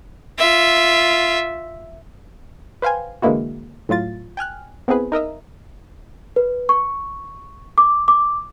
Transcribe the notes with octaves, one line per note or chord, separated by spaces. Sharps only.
F4 E5
B4 C5 F5 G5 G#5
D3 E3 G#3 A#3 E4 F#4
A2 F#3 F4 A6
G5 G#5 F6 F#6
B3 C4 E4 G#4 B4
D#4 A#4 D#5 E5
B4
C#6
D6
D6